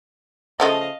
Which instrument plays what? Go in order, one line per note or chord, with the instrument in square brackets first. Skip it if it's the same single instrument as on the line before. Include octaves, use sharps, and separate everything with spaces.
[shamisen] C#3 F3 A3 [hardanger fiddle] D#5 F5